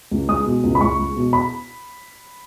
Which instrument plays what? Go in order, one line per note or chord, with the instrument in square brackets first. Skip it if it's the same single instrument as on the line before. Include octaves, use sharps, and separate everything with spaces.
[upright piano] C#2
G#3 D#6
B2
C#2
B5
C#2 C#6
G#3
B2
B5